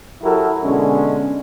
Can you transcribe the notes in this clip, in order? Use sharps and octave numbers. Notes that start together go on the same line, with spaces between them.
F#3 E4 F#4 G4 A4 A#4
B2 D3 G#3 C#4